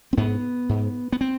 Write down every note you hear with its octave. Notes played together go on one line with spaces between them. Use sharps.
C4
G#2 B3
G#2
B3
C4